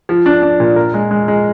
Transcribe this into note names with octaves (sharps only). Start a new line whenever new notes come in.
F3
D4
D4
A#2
A#4
G#3
G#3
G#3